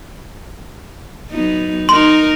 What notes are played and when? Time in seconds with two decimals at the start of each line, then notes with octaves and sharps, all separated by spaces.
1.31 F#3 B3 D#4
1.89 D#4 A#4 C6